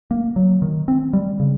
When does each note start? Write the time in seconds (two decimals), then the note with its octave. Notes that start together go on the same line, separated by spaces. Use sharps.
0.11 A#3
0.36 F#3
0.62 D#3
0.88 C4
1.13 G3
1.40 C#3